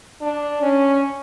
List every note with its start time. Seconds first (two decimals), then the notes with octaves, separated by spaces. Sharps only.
0.21 D4
0.62 C#4